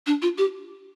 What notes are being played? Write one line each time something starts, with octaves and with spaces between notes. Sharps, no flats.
D4
F4
G4